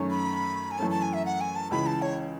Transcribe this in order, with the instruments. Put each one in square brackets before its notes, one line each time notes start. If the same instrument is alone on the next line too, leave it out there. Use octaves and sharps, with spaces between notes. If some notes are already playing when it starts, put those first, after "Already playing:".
Already playing: [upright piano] F#2 D#3 A3 C#4
[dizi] B5
G#5
[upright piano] F#2 E3 A3 C#4 [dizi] A5
[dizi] A5
G#5
E5
F#5
G#5
A5
[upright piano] C#2 C#3 E3 [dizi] B5
[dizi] A5
C#5